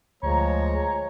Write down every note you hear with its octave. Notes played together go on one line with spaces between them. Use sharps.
D2 F3 G#3 C#5 A#5